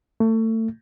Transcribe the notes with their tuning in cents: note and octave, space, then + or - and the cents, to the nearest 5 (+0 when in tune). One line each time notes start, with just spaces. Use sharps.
A3 +30